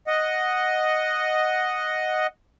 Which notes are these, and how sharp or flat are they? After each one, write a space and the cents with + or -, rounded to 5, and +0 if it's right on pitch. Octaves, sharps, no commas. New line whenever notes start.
D#5 +0 F#5 -5